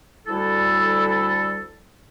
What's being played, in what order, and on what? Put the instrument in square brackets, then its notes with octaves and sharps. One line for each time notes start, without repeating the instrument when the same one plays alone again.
[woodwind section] D2 G3 E4 A4